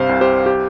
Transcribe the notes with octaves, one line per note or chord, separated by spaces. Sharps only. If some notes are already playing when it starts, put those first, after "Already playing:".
Already playing: G2 C3 C5 F5
C2
G4 C5
G4